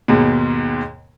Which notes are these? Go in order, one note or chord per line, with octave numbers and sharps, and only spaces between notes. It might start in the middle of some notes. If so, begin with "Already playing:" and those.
D#2 G#2 B2